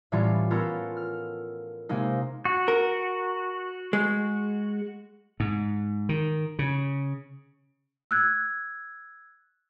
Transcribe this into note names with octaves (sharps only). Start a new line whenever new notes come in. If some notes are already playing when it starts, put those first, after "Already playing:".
A2 E3 G3 A3 C#4 F4
B3 C#4 F4 A4 A#4
F6
C3 G#3 A#3 D#4
F#4
A#4
G#3
G#2
D#3
C#3
E6 F#6 G#6